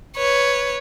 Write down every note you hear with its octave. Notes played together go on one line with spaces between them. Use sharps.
B4 C#5